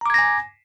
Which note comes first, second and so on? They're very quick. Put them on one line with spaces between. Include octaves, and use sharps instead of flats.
A#5 D6 G#6 A#6 G#5